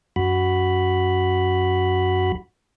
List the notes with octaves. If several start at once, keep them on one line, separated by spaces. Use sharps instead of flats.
F#2 F#4 B5